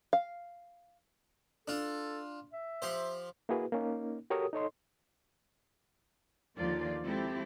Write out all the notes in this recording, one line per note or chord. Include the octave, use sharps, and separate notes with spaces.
F5
D4 F4 A4
E5
F3 G4 C5
A#3 E4 F#4 G#4 B4
A#3 C#4 D#4
F#4 G4 A4 A#4 C#5 D#6
D#4 A4 C#5 D#5 C6
D#2 D3 F3 F4 D5
F3 G#3 C4 E4 G4 A4